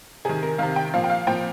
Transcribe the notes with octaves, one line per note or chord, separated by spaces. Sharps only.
C3 D#3 G#4
A#4
C3 D#3 F5
G5
A#2 F3 F5
G5
F5
A#2 F3 G5